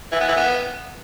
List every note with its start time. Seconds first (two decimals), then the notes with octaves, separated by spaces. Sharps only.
0.12 E3
0.20 B3
0.28 E3
0.37 B3